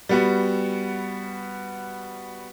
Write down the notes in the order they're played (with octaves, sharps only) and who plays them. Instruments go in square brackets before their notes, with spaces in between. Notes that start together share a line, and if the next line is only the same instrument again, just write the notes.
[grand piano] G3 B3 F#4